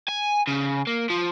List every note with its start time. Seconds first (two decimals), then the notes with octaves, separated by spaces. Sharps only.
0.09 G#5
0.47 C#3
0.87 A#3
1.10 F3